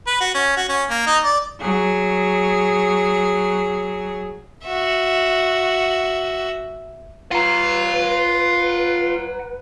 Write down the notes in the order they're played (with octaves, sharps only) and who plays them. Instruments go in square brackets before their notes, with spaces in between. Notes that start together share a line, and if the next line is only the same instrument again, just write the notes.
[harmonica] B4
F#4
C#4
F#4
C#4
A#3
D#4
D5
[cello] F#3 G#4
[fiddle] F#4 E5
[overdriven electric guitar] F4 [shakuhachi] B4 [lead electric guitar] F#5 A#5